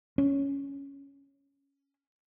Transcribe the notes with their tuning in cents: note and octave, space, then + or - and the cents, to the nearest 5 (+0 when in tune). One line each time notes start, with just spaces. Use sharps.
C#4 +5